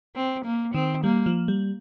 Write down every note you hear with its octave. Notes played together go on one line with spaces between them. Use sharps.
C4
A#3
D#3 C4
G3 A#3
F3
G3